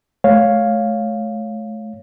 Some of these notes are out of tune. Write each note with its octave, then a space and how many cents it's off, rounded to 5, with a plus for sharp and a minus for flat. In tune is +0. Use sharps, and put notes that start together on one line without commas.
A3 -35 C#5 +0 F5 +0